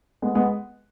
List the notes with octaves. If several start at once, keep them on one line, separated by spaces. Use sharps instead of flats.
G#3 B3
G#3 B3